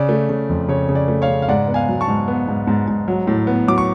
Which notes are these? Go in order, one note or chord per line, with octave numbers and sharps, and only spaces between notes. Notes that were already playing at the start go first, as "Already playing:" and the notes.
Already playing: C#3 D5
A3
C#3
F2
C#3 C#5
C#3
D5
A3
C#5 F5
C#3
F5
G#2 D5 F#5
B3
F5 G#5
F#3
A5 C#6
G#2
B3
G#2
G#2
G#2
F#3
A2
B3
F#3 D6
C#6